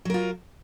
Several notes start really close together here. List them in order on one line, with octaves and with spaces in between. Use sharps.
F#3 A#4 F4